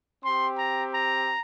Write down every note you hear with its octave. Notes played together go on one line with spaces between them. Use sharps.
C4 G4 C6
A#5
A#5